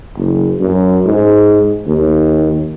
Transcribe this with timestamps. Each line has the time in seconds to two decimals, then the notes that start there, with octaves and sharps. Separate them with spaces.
0.17 F#1
0.60 F#2
1.05 G#2
1.87 D#2